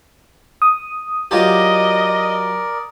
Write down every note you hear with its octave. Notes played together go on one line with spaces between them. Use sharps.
D#6
F#3 F4 G4 A#4 D5 D#5